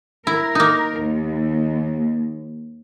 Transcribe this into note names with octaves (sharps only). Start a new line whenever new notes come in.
E4 A#4
A#3 D#4
D#2